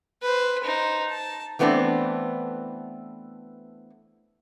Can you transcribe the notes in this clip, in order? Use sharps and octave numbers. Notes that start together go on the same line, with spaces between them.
B4 C5
D#4 C5
A5
E3 A3 B3 C4 D4